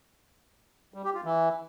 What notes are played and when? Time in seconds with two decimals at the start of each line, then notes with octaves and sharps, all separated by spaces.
0.94 G3
1.04 G4
1.14 F4
1.24 E3